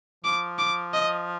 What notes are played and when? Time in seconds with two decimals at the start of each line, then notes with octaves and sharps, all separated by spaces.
0.24 F3 D6
0.59 D6
0.94 D#5